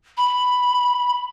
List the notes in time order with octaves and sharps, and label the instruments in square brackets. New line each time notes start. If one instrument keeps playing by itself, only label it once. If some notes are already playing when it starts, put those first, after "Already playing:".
[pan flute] B5